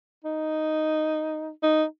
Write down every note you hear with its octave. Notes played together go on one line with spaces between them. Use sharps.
D#4
D#4